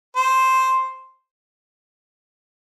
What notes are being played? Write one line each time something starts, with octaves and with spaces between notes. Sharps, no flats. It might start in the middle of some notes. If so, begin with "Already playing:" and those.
C5